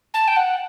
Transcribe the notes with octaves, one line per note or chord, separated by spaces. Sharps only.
A5
G5
F#5